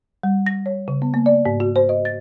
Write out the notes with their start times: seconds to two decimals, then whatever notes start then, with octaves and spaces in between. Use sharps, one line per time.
0.23 G3
0.46 A#6
0.66 C#5
0.88 C#3
1.02 B3
1.14 A#3
1.26 D5
1.46 G#2
1.60 F#4
1.76 C5
1.89 D#5
2.05 A6